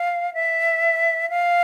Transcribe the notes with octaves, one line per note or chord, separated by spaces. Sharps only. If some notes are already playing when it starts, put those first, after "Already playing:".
Already playing: F5
E5
F5